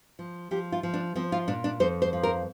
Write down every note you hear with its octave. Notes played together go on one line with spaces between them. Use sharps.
F3
F3 G4
F4
F3
D4
F3 C4
F4
A#2 D4
D4
F2 C5
C5
F3
A#4